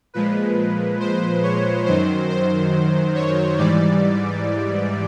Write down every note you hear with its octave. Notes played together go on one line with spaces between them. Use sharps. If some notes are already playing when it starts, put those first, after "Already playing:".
A#2 F3 G#3 B4
C5
C#5
F#2 D#3 F#3 C5
C5
C#5
G#2 E3 G3 D5